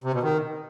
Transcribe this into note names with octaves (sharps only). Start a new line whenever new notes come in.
C3
B2
D#3